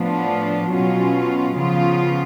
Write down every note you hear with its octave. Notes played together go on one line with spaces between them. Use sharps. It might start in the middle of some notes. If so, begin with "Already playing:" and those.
Already playing: A2 F3 B3 D4 F4
B2 F#3 C#4 F4
C#3 F3 B3 F4